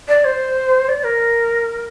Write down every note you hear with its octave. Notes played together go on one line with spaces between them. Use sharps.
D5
C5
D5
A#4